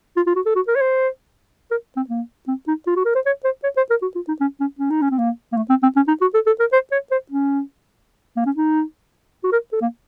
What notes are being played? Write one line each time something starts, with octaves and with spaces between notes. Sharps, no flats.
F4
F4
F#4
A4
F#4
A#4
C#5
C5
A#4
C4
A#3
C4
D#4
F4
F#4
A#4
C5
C#5
C5
C#5
C5
A#4
F#4
F4
D#4
C#4
C#4
C#4
D#4
C#4
C4
A#3
A#3
A3
C4
C4
C#4
D#4
F#4
A4
A4
A#4
C5
C#5
C5
C#4
A#3
C#4
D#4
F#4
A#4
A4
A#3